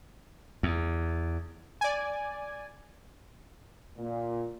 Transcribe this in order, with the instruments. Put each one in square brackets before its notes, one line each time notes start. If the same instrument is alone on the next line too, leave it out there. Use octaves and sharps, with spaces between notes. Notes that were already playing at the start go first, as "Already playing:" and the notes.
[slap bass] E2
[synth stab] D5 G#5
[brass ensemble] A#2